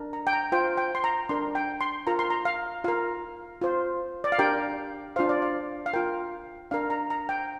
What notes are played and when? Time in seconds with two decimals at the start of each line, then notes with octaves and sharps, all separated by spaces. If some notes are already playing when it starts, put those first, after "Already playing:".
Already playing: D4 A#4
0.13 A#5
0.27 G5
0.33 A#5
0.52 F4 C5 G5
0.77 G5
0.95 C6
1.04 A#5
1.29 D4 A#4 C6
1.55 G5
1.81 C6
2.07 F4 A#4 A#5
2.19 C6
2.30 A#5
2.45 F5
2.84 F4 A#4 F5
3.61 F4 C5
4.24 D5
4.32 F5
4.38 D4 G4 A#4 G5
5.16 D4 F4 C5 F5
5.29 D5
5.42 F5
5.86 F5
5.93 F4 A#4 G5
6.71 D4 A#4 F5
6.90 A#5
7.10 A#5
7.29 G5